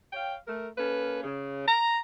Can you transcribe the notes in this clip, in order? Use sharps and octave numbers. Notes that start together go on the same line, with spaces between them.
C#5 F5 G5
A3 A#4
A#3 C#4 A4 B4
C#3
A#5